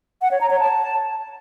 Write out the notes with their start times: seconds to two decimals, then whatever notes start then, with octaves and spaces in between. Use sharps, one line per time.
0.22 F#5
0.31 C#5
0.41 A#5
0.50 C#5
0.60 A5